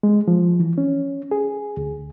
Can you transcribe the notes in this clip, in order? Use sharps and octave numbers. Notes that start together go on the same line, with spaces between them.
G#3
F3
E3
C#4
G#4
D2